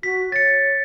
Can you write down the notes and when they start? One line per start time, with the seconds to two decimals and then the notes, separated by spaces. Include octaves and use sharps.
0.03 F#4 B6
0.32 C#5 A6 C#7